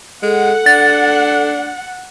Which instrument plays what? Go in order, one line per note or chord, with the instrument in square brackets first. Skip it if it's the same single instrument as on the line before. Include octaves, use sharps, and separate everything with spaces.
[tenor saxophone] G#3 [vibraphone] A4 [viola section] F#5
[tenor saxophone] D4 [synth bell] A6